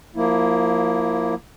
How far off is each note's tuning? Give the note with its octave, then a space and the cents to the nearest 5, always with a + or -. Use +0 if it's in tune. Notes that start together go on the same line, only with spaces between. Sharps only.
F3 +30 A#3 +0 E4 +0